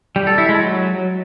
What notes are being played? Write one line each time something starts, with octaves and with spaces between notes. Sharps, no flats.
G3
A4
E4
G#3
F#3